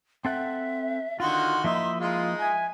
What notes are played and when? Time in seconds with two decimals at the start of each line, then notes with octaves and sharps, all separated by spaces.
0.25 C4 A4 E5 F#5
1.20 D3 D#3 F4 F#4 C6
1.64 F3 A#3 D#4 E4 E5
2.00 G#3 D#4 F4
2.40 E5 G#5